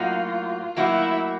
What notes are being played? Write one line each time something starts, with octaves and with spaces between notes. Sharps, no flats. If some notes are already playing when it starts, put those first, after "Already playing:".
Already playing: A2 F#3 A#3 D#4 F4 F#4
A2 F#3 A#3 D#4 E4 F#4